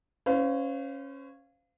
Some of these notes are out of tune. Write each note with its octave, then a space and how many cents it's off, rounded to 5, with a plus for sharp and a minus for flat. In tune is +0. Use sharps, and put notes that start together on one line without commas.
C#4 -10 C5 -40 F5 +0